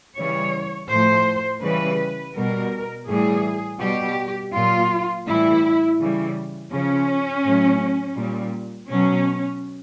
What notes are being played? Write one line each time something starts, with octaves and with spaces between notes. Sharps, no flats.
C#3 E3 G3 C#5
A2 F3 C5
C#3 E3 G3 B4
B2 G3 A#4
A2 E3 G3 G#4
B2 G3 G4
A#2 F#3 F4
A2 E3 G3 E4
C#3 E3 G3
C#3 F3 C#4
A2 F#3
A#2 G3
B2 F#3 C#4